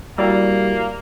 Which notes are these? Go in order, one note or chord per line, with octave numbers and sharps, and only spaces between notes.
G3 A#3 E4 F#4 D5